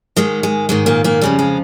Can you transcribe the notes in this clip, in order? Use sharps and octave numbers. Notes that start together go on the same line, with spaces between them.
G#2 D#3 G#3
G#3
G#2 D#3 G#3
A#2 A#3
A#2 A#3
F2 C#3 F3 G3
G#3